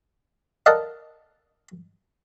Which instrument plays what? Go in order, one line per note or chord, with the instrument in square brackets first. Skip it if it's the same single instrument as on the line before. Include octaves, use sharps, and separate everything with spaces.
[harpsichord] A4 A#4 D5 D#5 F5 F#5